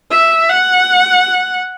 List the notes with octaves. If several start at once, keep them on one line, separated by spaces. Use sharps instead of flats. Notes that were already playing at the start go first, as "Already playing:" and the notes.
E5
F#5